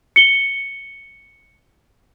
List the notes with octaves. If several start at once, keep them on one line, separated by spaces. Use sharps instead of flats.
C#7 G7